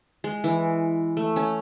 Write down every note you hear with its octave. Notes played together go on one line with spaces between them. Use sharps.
G#3
E3
A3
C#4